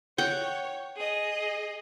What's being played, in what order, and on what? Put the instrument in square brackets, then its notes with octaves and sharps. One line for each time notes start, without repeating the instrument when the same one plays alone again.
[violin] C#5 [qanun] F#5 G5
[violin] G#4 D#5